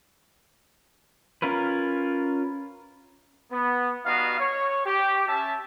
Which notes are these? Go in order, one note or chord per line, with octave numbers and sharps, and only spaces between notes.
C#4 F4 A#4 B4
B3
G3 B3 D#4 F#4 D#5 F5
C#5
G4
C#4 E5 A5